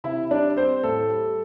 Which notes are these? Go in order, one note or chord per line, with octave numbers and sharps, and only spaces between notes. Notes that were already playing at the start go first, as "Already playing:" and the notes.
C3 E4 E5
G3 D4 D5
G3 C4 C5
A2 A4
G3